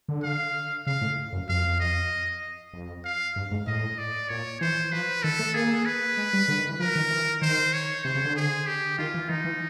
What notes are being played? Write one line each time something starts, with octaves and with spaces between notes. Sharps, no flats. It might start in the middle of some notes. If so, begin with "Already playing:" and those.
D3
F5
C#3 F5
A2
F#2
F2 F5
D#5
F2
F5
G2
G#2
A2 D#5
D5
A#2 C#5
E3 C5
F3 B4
D#3 A4
A3
A#3 G#4
B4
G#3
G3
D3
D#3
E3
F3 A#4
D#3
E3
D#3 C5
C#5
C3 C5
C#3
D3
G#4
G4
D#3 F4
E3
E3 D#4
E3